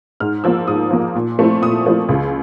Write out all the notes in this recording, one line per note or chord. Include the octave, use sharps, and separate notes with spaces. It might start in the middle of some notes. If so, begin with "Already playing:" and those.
G#2 F6
F3 A#3 E6
G#2 D#6
F3 A#3
A#2
F3 A3 C4 E4
A#2 D#6
F3 A3 C4 E4
C#2